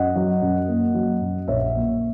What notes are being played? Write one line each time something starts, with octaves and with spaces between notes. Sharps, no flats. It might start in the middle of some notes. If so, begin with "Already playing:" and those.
Already playing: F#2 D#5 F#5
F#3
F#2
A#3
F#3
F#2
A#1 C#5 E5
A#3